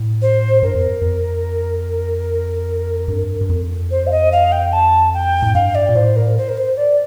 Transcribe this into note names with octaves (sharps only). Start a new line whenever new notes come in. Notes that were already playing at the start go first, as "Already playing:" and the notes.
Already playing: A2
C5
G2 A#4
F2
F2
G2
G2
F2
C5
F5
D#5
F5
G5
A5
G5
A2
G2 F5
D5
A#2
A2 C5
A#4
C5
A#4
C5
D5